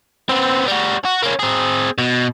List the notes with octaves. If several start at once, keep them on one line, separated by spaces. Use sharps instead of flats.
B3 C4
G3 F#4
F#4
A#3 C#4
C4 G#4
B2